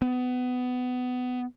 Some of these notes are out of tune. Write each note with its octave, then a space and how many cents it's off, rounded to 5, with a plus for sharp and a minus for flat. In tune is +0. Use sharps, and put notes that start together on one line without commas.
B3 +20